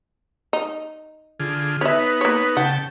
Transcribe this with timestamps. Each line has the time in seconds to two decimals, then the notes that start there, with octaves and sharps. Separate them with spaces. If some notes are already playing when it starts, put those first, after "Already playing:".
0.53 D#4
1.40 D3 F4 G#4
1.81 B3 D#4 B4 C#5 E5
2.21 A#3 C#5
2.57 C#3 F#5 G5 A5